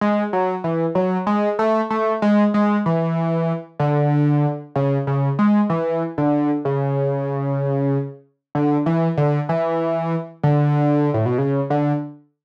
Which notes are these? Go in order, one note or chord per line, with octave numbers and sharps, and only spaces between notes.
G#3
F#3
E3
F#3
G#3
A3
A3
G#3
G#3
E3
D3
C#3
C#3
G#3
E3
D3
C#3
D3
E3
D3
E3
D3
A2
B2
C#3
D3